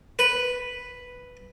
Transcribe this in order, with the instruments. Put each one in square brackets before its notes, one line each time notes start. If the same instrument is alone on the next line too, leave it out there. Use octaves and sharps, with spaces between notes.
[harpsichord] B4